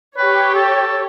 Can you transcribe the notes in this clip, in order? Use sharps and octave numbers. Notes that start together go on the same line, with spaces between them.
G4 B4 C#5
A4